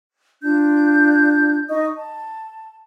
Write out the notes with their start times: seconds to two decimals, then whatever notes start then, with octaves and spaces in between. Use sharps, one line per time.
0.44 D4 F4 G6
1.69 D#4 D#5 C#6 D#6
1.96 A5